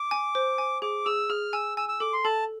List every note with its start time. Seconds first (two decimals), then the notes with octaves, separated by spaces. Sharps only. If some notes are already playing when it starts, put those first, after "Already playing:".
Already playing: D6
0.11 G#5
0.35 C5
0.58 G#5
0.82 G#4 D6
1.06 G#4 E6
1.30 G#4 F6
1.53 G#5 E6
1.77 G#5 E6
1.89 E6
2.00 A4 D6
2.13 C6
2.25 A4 A5